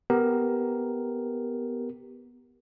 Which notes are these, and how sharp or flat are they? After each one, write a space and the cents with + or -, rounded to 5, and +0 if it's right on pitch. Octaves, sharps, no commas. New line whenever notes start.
B3 +0 G4 +0 A#4 +0